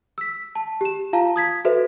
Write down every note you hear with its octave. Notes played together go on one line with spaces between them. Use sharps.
E6 B6
A5
G4 E7
F4 F5 A5 A#5
D#6 G#6 B6
F#4 A4 B4 C5 E5